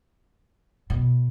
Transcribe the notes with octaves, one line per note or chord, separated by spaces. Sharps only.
B2